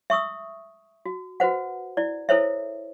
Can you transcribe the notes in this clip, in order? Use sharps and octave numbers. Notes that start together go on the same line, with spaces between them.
E5 C#6 D#6 E6
F#4
F#4 B4 C5 F#5
E4 D5
E4 A4 A#4 C5 C#5 E5